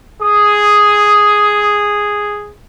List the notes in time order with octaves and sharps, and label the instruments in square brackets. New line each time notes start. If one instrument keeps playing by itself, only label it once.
[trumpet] G#4 [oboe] D#6